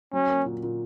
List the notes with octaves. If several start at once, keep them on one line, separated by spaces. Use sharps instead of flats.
F#3 C#4
A#3
A#2
A#2